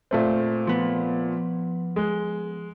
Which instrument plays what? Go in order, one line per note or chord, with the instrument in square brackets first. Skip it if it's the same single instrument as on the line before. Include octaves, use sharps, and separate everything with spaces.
[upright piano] A#2 A3 C4
[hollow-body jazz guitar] F3 B3
[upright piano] G#3